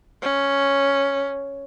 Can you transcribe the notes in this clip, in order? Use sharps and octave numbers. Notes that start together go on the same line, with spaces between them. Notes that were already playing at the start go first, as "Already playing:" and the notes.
C#4